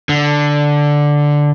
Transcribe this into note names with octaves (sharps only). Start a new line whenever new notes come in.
D3